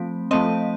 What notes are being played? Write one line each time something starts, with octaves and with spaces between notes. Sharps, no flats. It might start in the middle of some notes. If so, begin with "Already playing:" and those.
Already playing: F3 A3 C4
F3 A3 C4 D#5